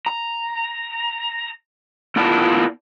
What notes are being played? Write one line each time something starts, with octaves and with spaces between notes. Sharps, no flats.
A#5
B3 E4 F4 A#4 D5 A5